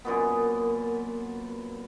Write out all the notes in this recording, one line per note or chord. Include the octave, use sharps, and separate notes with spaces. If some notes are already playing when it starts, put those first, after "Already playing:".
F#2 A#2 B3